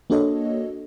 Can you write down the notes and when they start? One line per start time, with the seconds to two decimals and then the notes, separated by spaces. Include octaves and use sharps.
0.10 A#3 D4 F#4 A4 C#5 D#5